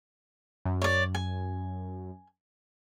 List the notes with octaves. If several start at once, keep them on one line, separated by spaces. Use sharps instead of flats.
F#2
C#5 D5
G#5